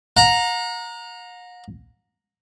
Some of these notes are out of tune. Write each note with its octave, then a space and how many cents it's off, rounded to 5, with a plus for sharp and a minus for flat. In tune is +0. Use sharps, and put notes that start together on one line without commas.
F#5 -45 A#5 +0